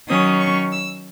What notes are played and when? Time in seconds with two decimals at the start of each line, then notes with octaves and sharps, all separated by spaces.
0.08 D#3 F#3 C#4 D#6
0.40 C#6
0.72 E6